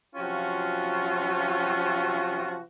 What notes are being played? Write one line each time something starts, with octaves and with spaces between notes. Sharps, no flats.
C3 F3 F#3 C#4 F4 F#4